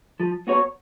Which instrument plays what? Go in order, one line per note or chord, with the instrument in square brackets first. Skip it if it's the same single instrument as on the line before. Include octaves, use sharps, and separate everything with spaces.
[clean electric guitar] F3
B3 F#4 C#5